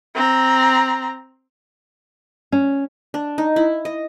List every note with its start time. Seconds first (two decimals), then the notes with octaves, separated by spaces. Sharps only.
0.15 C4 A#5
2.52 C#4
3.14 D4
3.38 D#4
3.56 E4
3.85 D#5